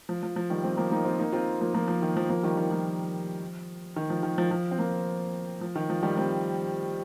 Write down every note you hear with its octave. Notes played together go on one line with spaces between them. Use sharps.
F3
F3
F3
D#3 G3
G3 C4
F3 A#3
A#3 D#4
C4 F4
A#3 D#4
C4 F4
F3 A#3
F3 A#3
F3
D#3
F3
F3 A#3
D#3 G3
D#3
F3
D#3
F3
D#3
F3
F3
C4
F3 A#3
F3
D#3
F3
D#3 G3
G3 C4